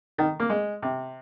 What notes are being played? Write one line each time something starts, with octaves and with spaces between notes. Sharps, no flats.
D#3
A#3
G#3
C3